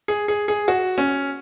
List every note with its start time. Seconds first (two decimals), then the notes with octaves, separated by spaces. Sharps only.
0.08 G#4
0.28 G#4
0.48 G#4
0.68 F#4
0.98 C#4